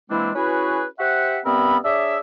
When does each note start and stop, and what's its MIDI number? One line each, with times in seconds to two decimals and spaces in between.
0.10 0.29 52
0.10 0.29 56
0.10 0.29 58
0.10 0.29 60
0.10 0.29 62
0.10 0.29 64
0.34 0.85 61
0.34 0.85 64
0.34 0.85 66
0.34 0.85 68
0.34 0.85 71
0.99 1.39 67
0.99 1.39 72
0.99 1.39 76
0.99 1.39 78
1.44 1.77 43
1.44 1.77 59
1.44 1.77 60
1.44 1.77 70
1.44 1.77 76
1.44 1.77 83
1.84 2.18 62
1.84 2.18 68
1.84 2.18 73
1.84 2.18 74
1.84 2.18 76